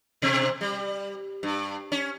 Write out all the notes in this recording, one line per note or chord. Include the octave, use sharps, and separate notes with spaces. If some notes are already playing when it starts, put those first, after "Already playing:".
B2 C4
G3
G2
C#4